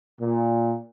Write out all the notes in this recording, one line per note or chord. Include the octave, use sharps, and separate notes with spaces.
A#2